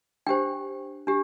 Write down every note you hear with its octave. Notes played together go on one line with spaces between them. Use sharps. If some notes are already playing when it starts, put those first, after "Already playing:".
D4 G4 C5 G5
D4 G4